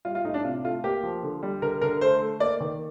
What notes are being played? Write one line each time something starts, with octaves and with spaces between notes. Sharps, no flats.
G3 F4
F4
A2 D#4
D4
C3 F4
A3 F4
A#3 G4
F3
D3
G3
D3 A#4
D3 A#4
A3 C5
A3
A#3 D5
D#3